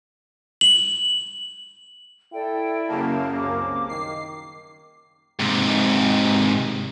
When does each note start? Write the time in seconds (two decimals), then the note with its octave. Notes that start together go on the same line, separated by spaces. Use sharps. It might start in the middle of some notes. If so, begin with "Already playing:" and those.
0.61 F#7
2.33 E4 A4 D5 G5
2.88 F#2 C#3 A#3 A5
3.39 C2 D6
3.89 D#3 C7
5.40 G#2 C3